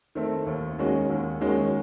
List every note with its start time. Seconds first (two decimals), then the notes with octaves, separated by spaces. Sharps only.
0.15 D#3 A3 C4
0.46 D#2
0.79 D#3 G#3 C#4 F#4
1.09 D#2
1.41 D#3 G#3 C#4 F#4